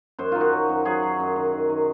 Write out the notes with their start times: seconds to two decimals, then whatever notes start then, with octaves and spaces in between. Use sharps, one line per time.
0.19 F#2 C5
0.32 D#3 F4
0.41 F#4
0.52 F#3
0.69 F#2
0.85 F#3 G#4
1.03 F#3
1.20 F#2
1.36 D#3
1.53 D#3
1.69 D#3